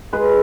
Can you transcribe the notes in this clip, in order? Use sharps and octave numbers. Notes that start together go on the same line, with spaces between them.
G#3 G#4 B4